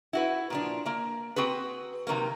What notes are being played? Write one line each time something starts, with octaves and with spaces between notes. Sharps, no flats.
E4 F#4 B4
A#2 F3 D4
A#3 A#5
C4 F#4 G#4 B4
C3 D#3 F#3 A#3